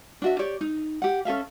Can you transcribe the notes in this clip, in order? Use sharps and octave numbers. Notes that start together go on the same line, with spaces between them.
D4 F#4 E5
G4 C#5 D5
D#4
G4 F#5
C#4 A4 E5 F5